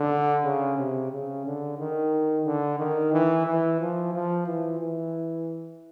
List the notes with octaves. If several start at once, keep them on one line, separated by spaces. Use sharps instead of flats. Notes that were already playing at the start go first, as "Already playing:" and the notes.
Already playing: D3
C#3
C3
C#3
D3
D#3
D3
D#3
E3
E3
F3
F3
E3
E3